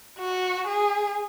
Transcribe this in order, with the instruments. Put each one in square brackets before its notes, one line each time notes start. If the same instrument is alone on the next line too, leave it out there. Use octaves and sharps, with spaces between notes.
[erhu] F#4
G#4